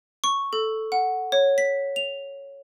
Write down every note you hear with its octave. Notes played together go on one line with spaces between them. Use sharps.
C#6
A4
F#5
C#5
B6
F7